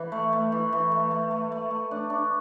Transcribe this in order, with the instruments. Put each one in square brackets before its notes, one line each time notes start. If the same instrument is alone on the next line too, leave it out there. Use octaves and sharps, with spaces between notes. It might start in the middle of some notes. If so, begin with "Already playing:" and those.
Already playing: [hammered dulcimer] E3
A3
A3
E3
E3
A3
A3
A3
A3
A3
D4
D4